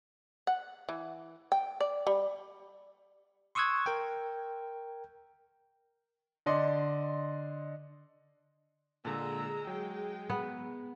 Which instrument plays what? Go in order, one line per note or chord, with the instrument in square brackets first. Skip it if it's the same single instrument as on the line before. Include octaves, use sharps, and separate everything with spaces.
[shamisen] F#5
E3
G5
D5
G3
[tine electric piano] C6 C#6 D#6 E6 F#6 G#6
A#4 G5
[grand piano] D3 D5 D#5 C6
[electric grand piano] A#2 D3 [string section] G#3 [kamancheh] A#5 E6
[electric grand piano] F#3 [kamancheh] G5
[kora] B3